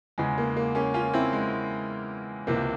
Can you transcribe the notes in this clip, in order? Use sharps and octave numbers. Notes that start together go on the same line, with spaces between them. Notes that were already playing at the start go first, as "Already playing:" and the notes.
E2 C#3 E3 G#3
A#3
A#3
A#3 C#4
C#4 F4
C4 E4
G#3
C#2 C3 E3 A#3